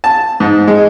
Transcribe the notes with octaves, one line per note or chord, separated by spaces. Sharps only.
A5
G#2
G#3